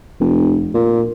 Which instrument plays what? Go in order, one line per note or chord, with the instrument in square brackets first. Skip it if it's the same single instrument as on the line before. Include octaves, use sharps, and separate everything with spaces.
[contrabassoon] F1
A#2